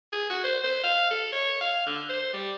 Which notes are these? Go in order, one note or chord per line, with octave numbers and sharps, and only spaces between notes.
G#4
F#4
C5
C5
F5
A4
C#5
F5
D3
C5
G3